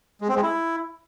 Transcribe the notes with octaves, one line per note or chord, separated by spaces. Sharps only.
G#3
C4
G#3
E4